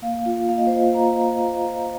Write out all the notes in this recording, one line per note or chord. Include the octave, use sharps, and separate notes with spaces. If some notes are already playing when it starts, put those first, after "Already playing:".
A#3 F5
F4
A#3 F5
D#5
C5
F4 D#5
A#3 A#5
F4
A#3
F4